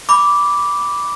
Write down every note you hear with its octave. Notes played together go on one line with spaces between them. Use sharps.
B5 D6